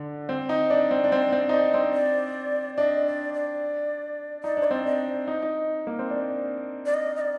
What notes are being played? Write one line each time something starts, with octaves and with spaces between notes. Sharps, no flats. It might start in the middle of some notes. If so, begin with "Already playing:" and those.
Already playing: D3
C4
D#4
D4
C4
D4
C4
C4
D#4
D4
C4
D5
D4 D#5
D5
D5
D#4 D5
D4 C5
D5
C4
D4 D#5
D#4
D#4
A#3
C4
D4
D5
D#5
D#5
D5